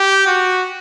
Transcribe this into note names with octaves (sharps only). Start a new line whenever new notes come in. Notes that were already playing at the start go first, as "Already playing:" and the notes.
Already playing: G4
F#4